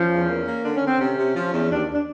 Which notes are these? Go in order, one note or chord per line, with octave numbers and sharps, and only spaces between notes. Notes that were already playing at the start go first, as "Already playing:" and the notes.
Already playing: F3 C#4
E2
A#3
A#3
D3 D4
C#4
D3
C4
C3 C#4
C3
F3
E2
D#2 D4
D4